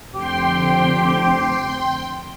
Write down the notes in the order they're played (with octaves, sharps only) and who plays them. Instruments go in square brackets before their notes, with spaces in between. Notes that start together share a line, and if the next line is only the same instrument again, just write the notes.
[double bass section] F1 D3 C4 [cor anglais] G4 [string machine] G5 C6